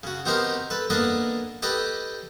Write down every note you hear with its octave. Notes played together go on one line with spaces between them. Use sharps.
C#3 F#4
B3 C4 D#4 G4 A#4 C5
A4 B4
A#3 B3 D4 A4 B4 D#5
G4 A4 B4 D#5 G5